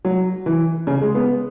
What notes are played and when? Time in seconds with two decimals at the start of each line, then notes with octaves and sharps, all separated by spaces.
0.05 F#3
0.46 E3
0.87 C#3
1.01 G#3
1.15 B3